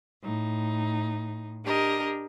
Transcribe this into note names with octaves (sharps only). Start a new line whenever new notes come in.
A2 D#4
D4 G4 A#4 D#5